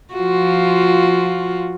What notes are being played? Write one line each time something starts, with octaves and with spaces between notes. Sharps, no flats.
F3 F4 F#4